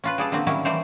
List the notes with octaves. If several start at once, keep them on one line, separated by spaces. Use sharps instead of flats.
C#4 F4 B4
G3 G#4 A4
D3 F#3 A#3 C4
D#3 F#3 G3 C#4 E4
E3 G3 A3 C5 C#5